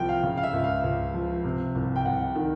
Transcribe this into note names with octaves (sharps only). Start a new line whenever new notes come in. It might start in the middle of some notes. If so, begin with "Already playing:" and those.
Already playing: C2 A#2 F3 G5
F5
C#3
F5
E5
C#2
F5
C#2
F3
C3
C2
G5
C2 F#5
D#3